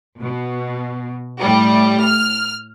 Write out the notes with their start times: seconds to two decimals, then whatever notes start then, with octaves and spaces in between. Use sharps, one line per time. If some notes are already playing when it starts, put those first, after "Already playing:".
0.21 B2
1.41 A2 G3
2.05 F6